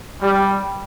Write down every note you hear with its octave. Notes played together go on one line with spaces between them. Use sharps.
G3